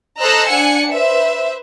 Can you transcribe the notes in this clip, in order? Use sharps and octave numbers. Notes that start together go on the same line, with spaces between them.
A4 C5 D#5 A#5 E6 F#6
D4 F#5 G#5 C#7
B4 C5 E5